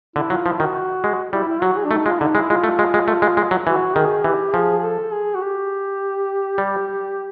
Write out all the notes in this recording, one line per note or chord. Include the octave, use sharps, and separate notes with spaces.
D3 E4
F#3 F4
F3 E4
D#3 F#4
G#3
G3 E4
E4
F#3 F#4
G#4
D4
A3 D#4
G#3 F4
D3 D#4
G#3 E4
G#3 F4
A3
G#3
G#3
A3
G#3
G#3
F#3
E3 F#4
D#3 G#4
E3 G4
F3 G#4
G#4
A4
G#4
F#4
G4
G3